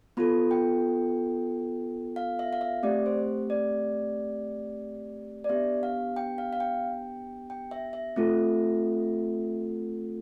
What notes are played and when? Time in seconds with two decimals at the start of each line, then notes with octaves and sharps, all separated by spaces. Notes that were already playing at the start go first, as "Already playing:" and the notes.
0.17 B3 F4 A4 B5
0.51 G5
2.16 F5
2.39 E5
2.53 F5
2.61 E5
2.83 A3 C4 G4 D5
3.06 C5
3.50 D5
5.44 D5
5.49 B3 D4 G4 E5
5.83 F5
6.16 G5
6.38 F5
6.53 F5
6.60 G5
7.50 G5
7.71 E5
7.93 E5
8.16 A3 C4 F4 A4